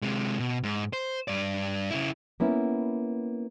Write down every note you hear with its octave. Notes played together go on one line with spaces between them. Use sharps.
C3 G#3
B2
G#2
C5
G2 D5
C#3 E4
A#3 B3 C#4 E4